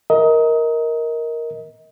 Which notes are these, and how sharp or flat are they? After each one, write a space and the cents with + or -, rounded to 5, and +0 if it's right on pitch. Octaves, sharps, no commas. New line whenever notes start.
A#4 +0 D#5 +30